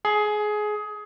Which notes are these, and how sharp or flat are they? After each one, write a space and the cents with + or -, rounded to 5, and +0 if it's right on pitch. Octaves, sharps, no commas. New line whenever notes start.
G#4 +20